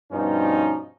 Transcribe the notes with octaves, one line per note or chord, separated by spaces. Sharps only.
G2 B2 F3 C#4 D#4